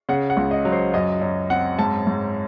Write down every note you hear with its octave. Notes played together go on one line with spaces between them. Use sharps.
C#3 F#5
F#5
C#2
D#5
F#3
C5
F#2 D#5
F#2
C4 F#5
G#2 A5
G#2